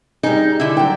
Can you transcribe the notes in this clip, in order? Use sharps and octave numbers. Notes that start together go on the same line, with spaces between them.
G3 D#4 G#4
D3 E4
F#3 G5